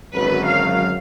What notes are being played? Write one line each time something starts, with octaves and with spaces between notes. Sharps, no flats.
G#1 F#2 D3 F#3 B4
F5